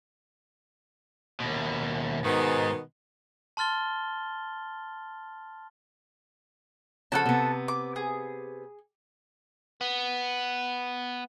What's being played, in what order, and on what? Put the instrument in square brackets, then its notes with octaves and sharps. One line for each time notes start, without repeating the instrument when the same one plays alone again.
[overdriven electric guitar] D#2 B2
[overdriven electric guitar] G#2 [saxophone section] B2 D#3 B3
[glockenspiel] A5 C6 F6 A6 G7
[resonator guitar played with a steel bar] C#3 F3 [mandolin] A4 F#5 A5
[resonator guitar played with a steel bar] C3 B3
[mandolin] D6
G#4
[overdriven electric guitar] B3